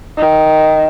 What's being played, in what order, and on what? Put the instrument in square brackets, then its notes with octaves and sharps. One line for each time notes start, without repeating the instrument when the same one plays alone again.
[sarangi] D#3